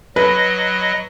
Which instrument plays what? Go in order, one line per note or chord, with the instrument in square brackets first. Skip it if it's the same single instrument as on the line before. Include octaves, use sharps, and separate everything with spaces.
[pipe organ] F#3 D#5 [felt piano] B4